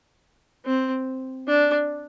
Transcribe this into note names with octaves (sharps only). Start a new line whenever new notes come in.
C4
D4